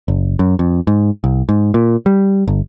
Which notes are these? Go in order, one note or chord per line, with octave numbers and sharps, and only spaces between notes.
F#1
F#2
F2
G#2
C2
G#2
A#2
G3
G1